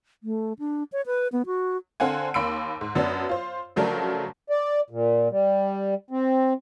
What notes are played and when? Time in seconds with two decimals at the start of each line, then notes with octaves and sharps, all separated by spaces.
0.23 A3
0.59 D4
0.92 C#5
1.06 B4
1.32 B3
1.46 F#4
2.00 D3 C4 F5 F#5 G#5
2.34 D#2 A#3 B5 C6 E6 D7
2.81 G#2
2.95 F#2 F#3 B3 D4
3.29 F4 C5
3.76 C#3 F3 F#3 A3 D4 A#4
4.50 D5
4.90 A#2
5.30 G3
6.10 C4